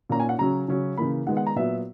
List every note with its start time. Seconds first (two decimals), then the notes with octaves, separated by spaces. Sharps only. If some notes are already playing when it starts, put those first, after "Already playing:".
0.09 A#2 A#3 C#4 A#5
0.20 G#5
0.29 F#5
0.39 C#3 F#3 C#4 A#5
0.68 C#3 F#3 C#4
0.97 C#3 E3 A#3 B5
1.27 D#3 G#3 B3 F#5
1.37 F#5
1.47 A#5
1.56 A#2 F#3 B3 E5